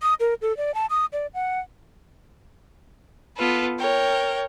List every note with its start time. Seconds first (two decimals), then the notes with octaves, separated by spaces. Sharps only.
0.03 D#6
0.20 A#4
0.42 A4
0.57 D5
0.74 A5
0.90 D#6
1.13 D5
1.34 F#5
3.36 B3 F4 A4 B4
3.78 A#4 C#5 G5